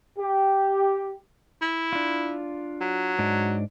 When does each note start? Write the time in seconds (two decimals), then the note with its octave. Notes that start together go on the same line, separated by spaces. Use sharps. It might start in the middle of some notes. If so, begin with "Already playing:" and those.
0.19 G4
1.61 E4
1.93 D4 F4
2.81 F#3
3.19 G#2 D4